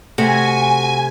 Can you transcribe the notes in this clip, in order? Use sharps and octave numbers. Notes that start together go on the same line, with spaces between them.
C3 A3 C4 F#4 G#5